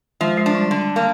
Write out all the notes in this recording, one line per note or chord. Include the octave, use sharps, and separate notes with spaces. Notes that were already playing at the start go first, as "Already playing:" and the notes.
F3 G#3
G#3
D4
G3
D3
A#3